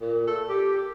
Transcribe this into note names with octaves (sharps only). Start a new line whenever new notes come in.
A#2
A4
G4